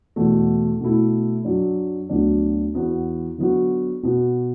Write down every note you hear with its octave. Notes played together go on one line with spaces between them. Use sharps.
E2 B2 A3
B2 A3 E4
F#2 F#3 D4
D2 D3 F#3 B3 D4
E2 E3 B3 F#4
D3 F#3 B3 F#4
B2 B3 F#4